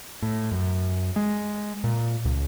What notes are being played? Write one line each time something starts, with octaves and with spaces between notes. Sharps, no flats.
A2
F#2
G#3
A#2
C#2